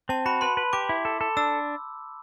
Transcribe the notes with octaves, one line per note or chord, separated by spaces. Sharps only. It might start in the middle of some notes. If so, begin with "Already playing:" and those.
C4 A5
F#4 B5
B4 C6
B4
G4 D6
E4
A4
A4
D4 E6